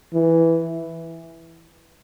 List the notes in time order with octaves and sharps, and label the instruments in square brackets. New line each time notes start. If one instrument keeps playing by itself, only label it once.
[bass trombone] E3